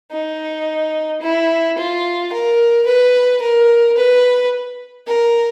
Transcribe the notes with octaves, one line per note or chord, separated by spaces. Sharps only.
D#4
E4
F4
A#4
B4
A#4
B4
A#4